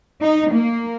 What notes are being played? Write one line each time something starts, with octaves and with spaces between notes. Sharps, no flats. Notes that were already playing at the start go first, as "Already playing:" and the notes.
D#4
A#3